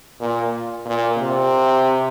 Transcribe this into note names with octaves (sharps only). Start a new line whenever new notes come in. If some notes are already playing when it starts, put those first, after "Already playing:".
A#2
A#2
C3